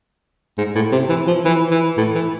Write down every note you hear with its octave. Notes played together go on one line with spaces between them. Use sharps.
G#2
A2
C3
E3
F3
E3
E3
A2
E3